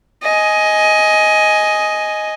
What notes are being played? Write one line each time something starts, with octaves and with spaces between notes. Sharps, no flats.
D#5 G#5